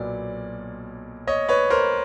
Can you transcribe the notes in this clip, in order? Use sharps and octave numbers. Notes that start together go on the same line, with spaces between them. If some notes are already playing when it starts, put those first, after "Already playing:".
Already playing: B1 A#2 F#3 B3 D5
C#5 D#5
B4 C#5
A#4 C5